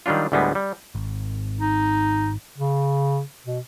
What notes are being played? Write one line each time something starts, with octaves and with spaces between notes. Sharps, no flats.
D#3 F#3 G3 D4 F4
D2 A2 G3 G#3 B3
G3
G#1
D#4
C#3
B2